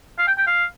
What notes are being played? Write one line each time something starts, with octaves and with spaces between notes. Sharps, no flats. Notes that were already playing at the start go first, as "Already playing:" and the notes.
F5
G5
G5
F5